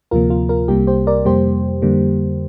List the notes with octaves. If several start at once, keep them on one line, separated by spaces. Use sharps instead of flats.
D2 C3 F3 A#3 F4 A#4
F4
F4 A#4
C2 C3 G3 A#3 G4
G4 C5
A#4 D5
F2 C3 G3 A#3 G4 C5
F2 D3 G3 A#3